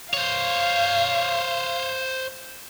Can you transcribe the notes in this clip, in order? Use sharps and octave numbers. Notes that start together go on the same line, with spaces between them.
C5 C#5 F5